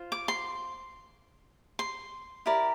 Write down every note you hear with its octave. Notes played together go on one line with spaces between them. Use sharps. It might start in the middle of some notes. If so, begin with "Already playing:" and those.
Already playing: F4 C5
D6
C6
C6
E4 G4 A#4 D5